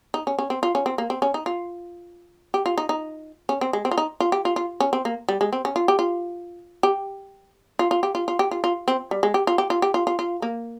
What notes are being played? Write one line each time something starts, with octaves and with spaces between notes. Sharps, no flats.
D#4
C#4
C#4
C4
F4
C#4
C4
A#3
C4
C#4
D#4
F4
G4
F4
D#4
D#4
C#4
C4
G#3
C4
F4
D#4
F4
G4
F4
F4
C#4
C4
A#3
G3
G#3
C4
C#4
F4
G4
F4
G4
F4
F4
G4
F4
F4
G4
F4
F4
C4
G3
G#3
G4
F4
G4
F4
G4
F4
F4
F4
A#3